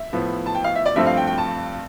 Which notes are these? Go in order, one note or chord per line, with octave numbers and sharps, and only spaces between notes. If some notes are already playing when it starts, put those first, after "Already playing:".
Already playing: E5
A2 F3 B3
A5
G5
F5
E5
D5
G2 F3 A3 C4 E5
F5
G5
G5
A5